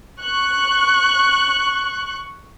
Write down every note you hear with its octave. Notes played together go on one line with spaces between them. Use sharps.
C#6 F#6